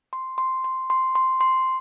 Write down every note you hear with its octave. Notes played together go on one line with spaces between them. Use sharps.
C6
C6
C6
C6
C6
C6